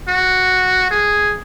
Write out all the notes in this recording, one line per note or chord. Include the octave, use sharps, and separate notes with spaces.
F#4
G#4